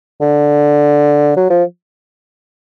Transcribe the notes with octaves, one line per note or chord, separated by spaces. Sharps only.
D3
F#3
F3